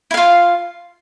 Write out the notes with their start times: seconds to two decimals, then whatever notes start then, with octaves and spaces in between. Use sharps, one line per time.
0.11 E4
0.14 F5
0.17 F4